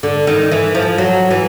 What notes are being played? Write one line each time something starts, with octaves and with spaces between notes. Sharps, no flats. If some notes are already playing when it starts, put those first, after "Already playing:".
D3
D#3
E3
F3
F#3
E3